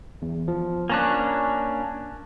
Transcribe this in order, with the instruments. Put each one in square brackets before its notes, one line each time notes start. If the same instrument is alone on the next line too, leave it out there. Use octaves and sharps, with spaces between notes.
[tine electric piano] E2
F3
[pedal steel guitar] A#3 C#4 D4 [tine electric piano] G#5 A5 F#6